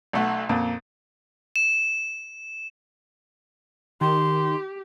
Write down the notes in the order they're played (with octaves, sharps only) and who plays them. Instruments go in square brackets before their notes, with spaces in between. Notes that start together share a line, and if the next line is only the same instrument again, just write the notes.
[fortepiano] B1 A3 F#5
F2 A#2
[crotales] E7
[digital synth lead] D#3 [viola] G4 [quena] C6